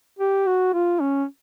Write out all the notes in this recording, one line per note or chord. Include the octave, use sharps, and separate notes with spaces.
G4
F#4
F4
C#4